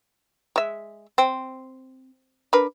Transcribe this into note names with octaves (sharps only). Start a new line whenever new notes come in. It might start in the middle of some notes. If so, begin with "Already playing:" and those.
G#3 E5
C4
D4 A#4 B4